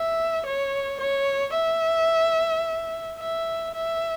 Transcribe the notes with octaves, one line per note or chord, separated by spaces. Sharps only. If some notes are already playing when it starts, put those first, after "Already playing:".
Already playing: E5
C#5
C#5
E5
E5
E5